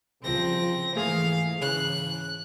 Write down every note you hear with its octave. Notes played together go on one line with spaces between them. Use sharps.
C2 C#3 F3 C4 A#6
G#2 E3 A3 A#3 G#4 F5
C#3 F#6